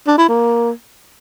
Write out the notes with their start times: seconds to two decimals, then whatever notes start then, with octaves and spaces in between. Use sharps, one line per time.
0.07 D4
0.18 E4
0.28 A#3